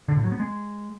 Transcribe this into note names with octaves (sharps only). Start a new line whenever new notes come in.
D3
A2
F#3
B3
G#3